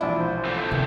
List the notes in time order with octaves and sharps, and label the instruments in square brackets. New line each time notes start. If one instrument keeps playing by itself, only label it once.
[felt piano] E1 A#1 E4 [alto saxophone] D4
[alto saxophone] C5
[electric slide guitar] D3 A3 C4
[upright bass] C3 D#3 [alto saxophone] E3